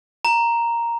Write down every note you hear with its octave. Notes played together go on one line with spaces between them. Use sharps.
A#5